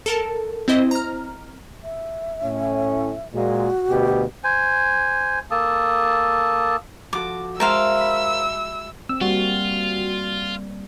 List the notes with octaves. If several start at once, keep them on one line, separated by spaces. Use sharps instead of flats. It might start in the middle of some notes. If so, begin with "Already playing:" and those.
A4 A#4 A5
C4 E4 C5 D#5
A#5 F6
E5
A2 C#4
A#2 G#3 F#4
D2 B2 G4
C5 G#5
A#3 A4 A5 D#6
F3 F#4 A4 D6
G#3 A#4 C5 E5 F5 A5 E6
B5
C4 E6
G3 A#3 F4 F#4